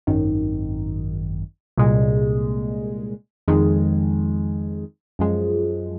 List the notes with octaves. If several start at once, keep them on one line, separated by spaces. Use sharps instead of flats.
G#1 F#2 D#3
C2 A#2 G#3
F2 D#3 G#3
F#2 F3 G#3